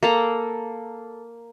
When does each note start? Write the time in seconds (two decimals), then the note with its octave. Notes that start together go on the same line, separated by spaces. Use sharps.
0.03 A#3 A4 A#5